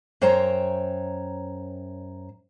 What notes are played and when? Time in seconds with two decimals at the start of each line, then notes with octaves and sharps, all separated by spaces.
0.21 F#2 C5 C#5 G5 A#5